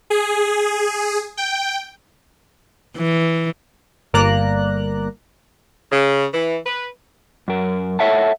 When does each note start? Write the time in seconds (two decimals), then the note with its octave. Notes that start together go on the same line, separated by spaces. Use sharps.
0.10 G#4
1.37 G5
2.97 E3
4.13 G1 G2 A#3 D5 A#5 F#6
5.92 C#3
6.33 E3
6.66 B4
7.48 F#2 A#4
7.99 A4 A#4 C#5 E5 F#5 A5